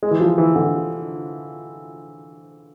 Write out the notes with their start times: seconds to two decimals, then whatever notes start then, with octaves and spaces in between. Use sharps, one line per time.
0.03 G#3
0.11 E3
0.20 F3
0.38 E3
0.56 D3